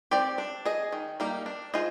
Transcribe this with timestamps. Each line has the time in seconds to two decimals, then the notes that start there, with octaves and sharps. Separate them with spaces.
0.11 C4 G4 D5
0.38 D4
0.65 G#4 D#5
0.93 D#3
1.20 G3 A#3 D#4 A#4
1.46 D4
1.74 F4 G#4 C5 D#5